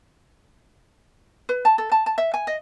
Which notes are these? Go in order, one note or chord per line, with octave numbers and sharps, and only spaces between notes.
B4
A5
A4
A5
A5
E5
G#5
D#5